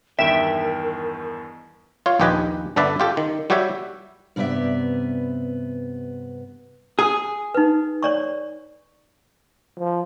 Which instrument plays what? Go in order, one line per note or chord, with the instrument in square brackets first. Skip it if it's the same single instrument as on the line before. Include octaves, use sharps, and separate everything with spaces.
[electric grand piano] E2 G2 D#3 [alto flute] A#4 [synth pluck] E5 [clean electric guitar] G5
[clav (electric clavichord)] F4 C#5 F5
A#1 D#2 G4 B4 D#5 G#5
G1 D3 A4 B4 D5 E5
F4 G4 A4
D#3
G3 F#4 G4 C#5 E5
[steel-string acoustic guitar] G2 C3 B3 D5 E5
[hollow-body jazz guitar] G#4
[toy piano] D#4 B4
C#5 D5 C#6
[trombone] F3